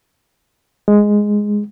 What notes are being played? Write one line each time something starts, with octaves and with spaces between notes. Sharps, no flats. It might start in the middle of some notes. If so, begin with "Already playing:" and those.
G#3